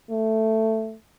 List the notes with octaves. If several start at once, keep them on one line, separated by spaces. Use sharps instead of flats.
A3